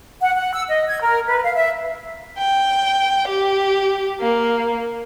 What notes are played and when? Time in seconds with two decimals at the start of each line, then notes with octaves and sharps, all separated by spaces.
0.22 F#5
0.36 F#5
0.53 E6
0.68 D#5
0.87 G#6
1.01 A#4
1.28 B4
1.43 F5
1.54 E5
2.38 G5
3.28 G4
4.21 A#3